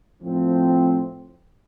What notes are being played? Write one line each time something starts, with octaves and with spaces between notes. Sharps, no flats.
A2 F3 C4